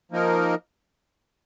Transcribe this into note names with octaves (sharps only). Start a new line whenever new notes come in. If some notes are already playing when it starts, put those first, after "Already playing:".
F3 A#3 D#4 A#4